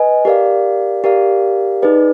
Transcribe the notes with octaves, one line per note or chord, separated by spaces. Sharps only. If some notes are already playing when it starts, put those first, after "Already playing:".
Already playing: B4 D#5 G#5
G4 A#4 D5 F5
G4 A#4 D5 F5
D#4 G#4 B4 D5